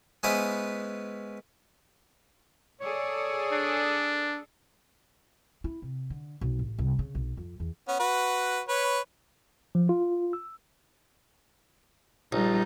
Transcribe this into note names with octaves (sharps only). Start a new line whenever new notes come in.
G#3 B3 C#4 E4 B4 C5
G#4 A4 C#5 D5
D4
E4
C3
D3
B1
A1
C2
C#3
B1
F2
E2
B3 C#4
F#4 B4
B4 C#5
F3
F4
E6
A#1 G3 D#4